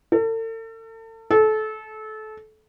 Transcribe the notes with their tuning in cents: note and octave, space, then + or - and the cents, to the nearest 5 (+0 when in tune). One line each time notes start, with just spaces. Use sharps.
A4 +40
A4 -25